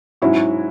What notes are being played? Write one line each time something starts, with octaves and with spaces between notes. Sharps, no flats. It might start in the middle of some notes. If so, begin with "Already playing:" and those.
G#2 F#3 C#4 E4 F#4